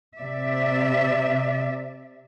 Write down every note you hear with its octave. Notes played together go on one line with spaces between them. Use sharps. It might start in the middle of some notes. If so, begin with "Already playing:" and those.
C3 D5 E5